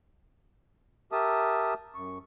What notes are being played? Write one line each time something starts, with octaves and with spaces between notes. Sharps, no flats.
G4 A#4 E5 A5 D#6
F#2 C#6